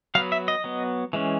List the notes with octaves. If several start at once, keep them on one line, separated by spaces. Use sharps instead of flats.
F#3 B3 F5
E5
D#5
F#3 B3
E3 G#3 C#4